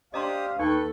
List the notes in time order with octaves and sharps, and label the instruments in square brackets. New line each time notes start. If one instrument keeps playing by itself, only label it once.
[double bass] D4 [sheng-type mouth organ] G4 C5 D#6 [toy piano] D#5 A#5 C6 [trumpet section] F5
[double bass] D#2 [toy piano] D#4 [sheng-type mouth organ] A4 [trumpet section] B4 G5 C#6